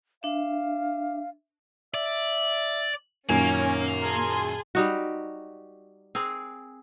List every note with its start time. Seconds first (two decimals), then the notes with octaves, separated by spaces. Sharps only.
0.23 D4 E5 F5
1.94 D5 E5
3.29 F#2 A#2 D#3 A#3 C#4 G#5
4.02 G#4 A#4 A5 C6
4.75 G3 D#4 F#4
6.15 C4 G#4 A#4